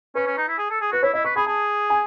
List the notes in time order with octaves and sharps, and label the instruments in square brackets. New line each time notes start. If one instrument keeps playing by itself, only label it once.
[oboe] C#4 [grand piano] B4
[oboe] C#4
D#4
E4
G#4
A4
G#4
[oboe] F#4 [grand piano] B4
[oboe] E4 [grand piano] C#5
[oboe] E4 [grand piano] D#5
[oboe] B4 [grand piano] C#6
[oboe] G#4 [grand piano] B5
[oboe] G#4 [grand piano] A5
[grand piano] G#5